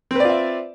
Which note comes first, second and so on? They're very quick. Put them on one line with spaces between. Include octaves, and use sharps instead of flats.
C4 B4 D5 F4 E5